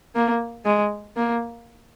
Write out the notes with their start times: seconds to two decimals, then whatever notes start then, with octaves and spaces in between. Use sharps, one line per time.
0.16 A#3
0.65 G#3
1.16 A#3